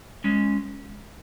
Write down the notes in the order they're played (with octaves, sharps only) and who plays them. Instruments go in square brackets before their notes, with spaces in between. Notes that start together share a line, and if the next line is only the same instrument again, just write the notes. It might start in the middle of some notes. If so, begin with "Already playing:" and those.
[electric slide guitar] G#3 C#4